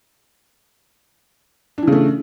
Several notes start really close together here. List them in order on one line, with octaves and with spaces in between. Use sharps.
D4 E3 C#3 A3